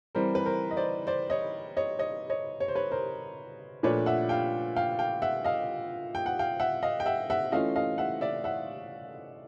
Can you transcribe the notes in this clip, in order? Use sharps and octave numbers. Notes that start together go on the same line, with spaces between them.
E3 G3 C4 A#4 C5
B4
A#4 C5
D#5
C5 D5
C5 D5
C#5 D#5
C#5 D#5
C#5 D#5
C#5 D#5
C#5
C5
B4 C#5
A#4 C5
A#2 F3 A3 D4 B4 C#5
E5 F#5
F5 G5
F5 G5
F5 G5
E5 F#5
D#5 F5
G5
F#5
F5 G5
E5 F#5
D#5 F5
G5
E5 F#5
E5 F#5
E3 A3 C#4 F4 D#5 F5
D#5 F5
E5 F#5
D5 E5
E5 F#5